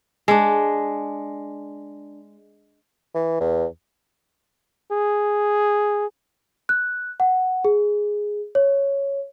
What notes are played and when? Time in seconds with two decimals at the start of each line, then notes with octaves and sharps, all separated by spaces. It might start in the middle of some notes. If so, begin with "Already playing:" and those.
0.28 G#3 D4
3.15 E3
3.41 E2
4.92 G#4
6.69 F#6
7.20 F#5
7.65 G#4
8.55 C#5